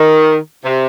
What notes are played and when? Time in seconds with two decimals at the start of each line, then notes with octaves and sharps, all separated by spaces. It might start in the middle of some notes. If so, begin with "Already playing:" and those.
Already playing: D#3
0.64 C3